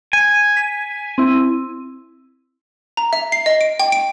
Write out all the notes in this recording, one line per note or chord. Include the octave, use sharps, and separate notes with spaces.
G#5
B6
C4 E4
A#5
E5
C7
D#5
D7
G5
D7